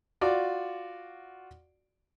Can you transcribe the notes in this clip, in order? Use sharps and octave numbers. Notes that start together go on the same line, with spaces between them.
F4 F#4 D5 D6